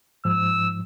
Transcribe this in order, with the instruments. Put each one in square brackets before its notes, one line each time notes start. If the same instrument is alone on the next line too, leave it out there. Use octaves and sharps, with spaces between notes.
[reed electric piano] G#2 F3 [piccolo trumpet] E6